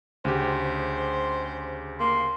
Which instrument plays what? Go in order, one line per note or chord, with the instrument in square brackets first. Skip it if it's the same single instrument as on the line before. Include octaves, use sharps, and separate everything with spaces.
[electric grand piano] D2 C#3 G4 [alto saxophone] C5
[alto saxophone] A#3 [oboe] C6